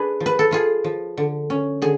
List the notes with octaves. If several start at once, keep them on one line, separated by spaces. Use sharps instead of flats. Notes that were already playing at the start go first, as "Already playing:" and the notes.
Already playing: D4 G#4 B4
F3
B4
A4
F3 F4 G#4
F3
D3
C#4
D3 G#4